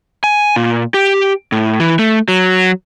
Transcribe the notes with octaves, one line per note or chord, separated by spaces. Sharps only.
G#5
A#2
G4
A2
E3
A3
F#3